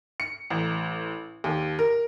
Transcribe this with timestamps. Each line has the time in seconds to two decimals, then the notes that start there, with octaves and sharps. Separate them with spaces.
0.20 C#7
0.50 A1
1.44 D#2
1.79 A#4